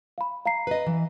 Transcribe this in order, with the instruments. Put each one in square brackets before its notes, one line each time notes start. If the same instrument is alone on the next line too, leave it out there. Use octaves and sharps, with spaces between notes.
[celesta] F5 B5
F5 A#5 C7
[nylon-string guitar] B4 D#5
E3